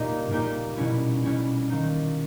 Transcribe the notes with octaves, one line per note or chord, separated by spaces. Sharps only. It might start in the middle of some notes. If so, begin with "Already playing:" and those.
Already playing: A#2 G3 A#3 D#4 G4
A#2 A#3 D#4 G4
B2 G3 C#4 E4
B2 G3 C#4 E4
D#3 A#3 D#4